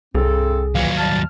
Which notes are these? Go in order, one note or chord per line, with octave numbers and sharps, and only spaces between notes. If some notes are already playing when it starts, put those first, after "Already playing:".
C2 G2 C4 G#4 A4
D#2 A#2 E3 F#3 A#3 F5
B2 G3 A5 F6